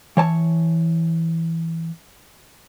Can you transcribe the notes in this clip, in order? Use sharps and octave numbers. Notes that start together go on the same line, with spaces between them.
E3 C#5 A5